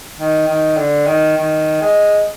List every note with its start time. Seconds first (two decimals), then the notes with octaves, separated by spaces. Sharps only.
0.18 D#3
0.48 D#3
0.77 D3
1.07 D#3
1.37 D#3
1.81 G#3